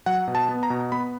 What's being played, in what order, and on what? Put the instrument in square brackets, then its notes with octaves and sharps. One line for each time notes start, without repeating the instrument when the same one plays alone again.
[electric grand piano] F#3 F#5
B2
A5
B3
A#5
B2
B3 B5